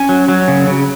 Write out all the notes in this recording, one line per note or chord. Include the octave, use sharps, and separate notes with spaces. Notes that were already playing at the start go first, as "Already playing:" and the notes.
Already playing: C#4 G#5
F#3
F#3
C#3
C#3